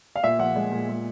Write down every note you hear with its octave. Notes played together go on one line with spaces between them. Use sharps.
F5
A#2 E5
F3 F#5
G#3
A#2
G#3